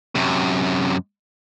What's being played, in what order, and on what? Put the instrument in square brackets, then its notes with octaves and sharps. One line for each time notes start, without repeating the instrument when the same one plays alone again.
[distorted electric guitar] F#2 C3